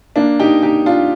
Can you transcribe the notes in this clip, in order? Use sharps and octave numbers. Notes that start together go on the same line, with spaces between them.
A#3 D4
D#4 G4
D#4 G4
D4 F4